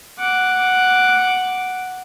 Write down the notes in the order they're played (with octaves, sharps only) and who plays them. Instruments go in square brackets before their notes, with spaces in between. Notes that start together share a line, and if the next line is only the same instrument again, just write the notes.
[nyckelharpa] F#5 D6